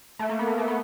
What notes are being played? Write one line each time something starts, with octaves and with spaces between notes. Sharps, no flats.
A3
A#3
B3
A#3
A3
B3